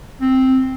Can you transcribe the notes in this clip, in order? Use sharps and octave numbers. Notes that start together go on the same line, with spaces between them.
C4